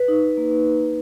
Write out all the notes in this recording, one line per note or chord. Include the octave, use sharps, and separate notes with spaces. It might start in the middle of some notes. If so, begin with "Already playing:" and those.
Already playing: B4
D#4
D#4
A#3
A#3